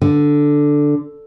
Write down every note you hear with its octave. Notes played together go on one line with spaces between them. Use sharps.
D3